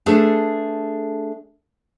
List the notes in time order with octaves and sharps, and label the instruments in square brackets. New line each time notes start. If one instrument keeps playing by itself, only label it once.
[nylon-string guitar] A3 D4 G#4 A4 B4